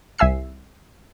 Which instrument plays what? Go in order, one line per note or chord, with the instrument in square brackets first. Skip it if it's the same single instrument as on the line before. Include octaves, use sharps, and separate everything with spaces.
[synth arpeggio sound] C2 E5 G#5 E6 C7